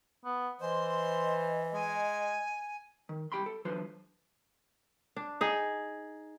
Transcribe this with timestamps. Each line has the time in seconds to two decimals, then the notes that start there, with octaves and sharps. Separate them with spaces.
0.25 B3
0.61 E3 C5 D#5 C6
1.74 G#3 G#5
3.09 D#3
3.32 C2 G#2 G4 G5 B5 C6
3.46 A4
3.65 D3 E3 F#3 F4 B4 C5
5.16 D4
5.41 D#4 G#4